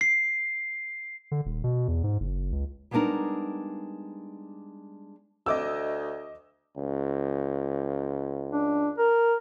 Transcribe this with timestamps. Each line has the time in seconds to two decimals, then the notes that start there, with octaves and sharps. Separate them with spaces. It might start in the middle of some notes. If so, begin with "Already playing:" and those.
0.01 C7
1.31 D3
1.45 D#1
1.64 B2
1.88 E2
2.04 G#2
2.20 F#1
2.52 C#2
2.91 G3 G#3 B3 D4 D#4 A#4
5.46 D2 D#5 D6 E6
6.77 C#2
8.52 D4
8.98 A#4